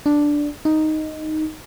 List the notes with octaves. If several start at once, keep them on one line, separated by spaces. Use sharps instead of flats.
D4
D#4